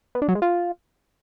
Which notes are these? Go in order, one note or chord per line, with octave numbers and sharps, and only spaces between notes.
B3
D4
F#3
G#3
F4